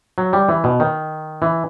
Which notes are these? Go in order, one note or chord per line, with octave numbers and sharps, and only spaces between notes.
F#3
G3
E3
B2
D#3
E3